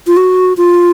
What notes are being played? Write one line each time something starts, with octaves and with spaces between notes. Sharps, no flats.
F4
F#4
F4